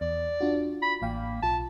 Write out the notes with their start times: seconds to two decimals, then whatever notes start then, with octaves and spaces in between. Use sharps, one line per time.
0.01 E2 D5
0.40 D4 F4 F#4
0.82 B5
1.02 A1 A#3 F5 G5
1.42 B1 F4 A5